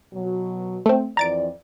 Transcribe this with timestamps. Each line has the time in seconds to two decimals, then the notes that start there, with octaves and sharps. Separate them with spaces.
0.14 B2 F#3
0.86 A3 C4
1.17 F2 E3 D5 A#5 A6 D7